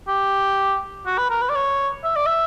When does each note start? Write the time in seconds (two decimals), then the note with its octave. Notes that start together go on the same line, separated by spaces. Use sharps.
0.08 G4
1.06 F#4
1.18 B4
1.30 A#4
1.42 B4
1.50 D5
1.55 C#5
2.04 E5
2.16 D5
2.27 E5